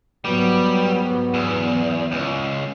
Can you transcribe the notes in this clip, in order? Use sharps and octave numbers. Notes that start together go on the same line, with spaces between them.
G#2 F#3 G3 B3
E2
C#2